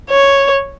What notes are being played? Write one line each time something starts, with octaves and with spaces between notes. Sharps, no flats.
C#5